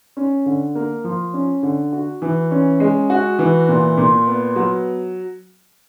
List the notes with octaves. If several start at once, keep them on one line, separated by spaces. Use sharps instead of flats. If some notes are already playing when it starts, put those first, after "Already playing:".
C#4
D3
A#3
F3
C#4
D3
F#4
E3
C#4
G#3
F#4
E3
A#2
A#2
B3
F#3